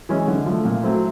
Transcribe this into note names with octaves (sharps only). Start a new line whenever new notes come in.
E3 G#3 C#4
D3
F3 A3
A#2
F#3 A3 C4 E4